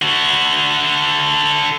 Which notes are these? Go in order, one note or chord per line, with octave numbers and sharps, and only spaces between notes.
D3 F#4